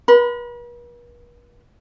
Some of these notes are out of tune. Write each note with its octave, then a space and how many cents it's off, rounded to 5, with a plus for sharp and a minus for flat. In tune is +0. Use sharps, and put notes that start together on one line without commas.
B4 -45 B5 +35